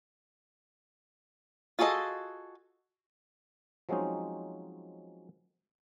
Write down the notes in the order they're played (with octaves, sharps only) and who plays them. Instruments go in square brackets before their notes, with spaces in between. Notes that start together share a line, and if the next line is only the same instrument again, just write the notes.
[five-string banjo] F4 F#4 G#4 A4 D#5
[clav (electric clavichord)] F3 F#3 G#3 C4 C#4 D#4